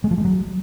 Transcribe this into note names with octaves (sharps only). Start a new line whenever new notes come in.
G#3
F3
G#3
F#3